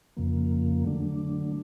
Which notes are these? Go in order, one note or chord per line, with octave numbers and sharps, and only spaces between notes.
F2 C#3 F3 A#3
D3 F#3 A3 D4